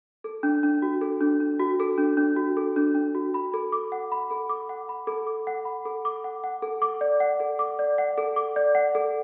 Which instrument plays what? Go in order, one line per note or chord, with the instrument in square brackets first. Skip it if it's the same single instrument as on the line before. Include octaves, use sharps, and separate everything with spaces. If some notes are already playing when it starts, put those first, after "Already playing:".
[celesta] A4
D4
D4
F#4
A4
D4
D4
F#4
A4
D4
D4
F#4
A4
D4
D4
F#4
B5
A4
D6
F#5
B5
A4
D6
F#5
B5
A4
D6
F#5
B5
A4
D6
F#5
F#5
A4
D6
D5
F#5
A4
D6
D5
F#5
A4
D6
D5
F#5
A4